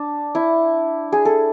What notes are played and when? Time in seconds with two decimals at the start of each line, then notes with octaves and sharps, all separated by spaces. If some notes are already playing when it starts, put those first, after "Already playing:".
Already playing: D4
0.35 E4
1.12 G#4
1.25 A4